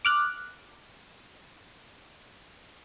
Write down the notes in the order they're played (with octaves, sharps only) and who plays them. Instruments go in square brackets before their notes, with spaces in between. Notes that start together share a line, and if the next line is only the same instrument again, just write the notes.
[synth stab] D6 F6 F#6